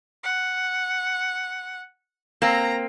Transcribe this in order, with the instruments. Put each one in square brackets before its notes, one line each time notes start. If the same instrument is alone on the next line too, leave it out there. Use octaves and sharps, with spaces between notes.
[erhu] F#5
[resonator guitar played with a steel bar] A#3 C4 [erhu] A#5